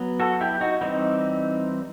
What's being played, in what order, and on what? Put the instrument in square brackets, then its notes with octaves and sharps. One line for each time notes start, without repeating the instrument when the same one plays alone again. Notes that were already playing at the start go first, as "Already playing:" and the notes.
Already playing: [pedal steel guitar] F#3 B3
F#4 A4
E4 G4
D#4 F#4
E3 G3 C4 D#4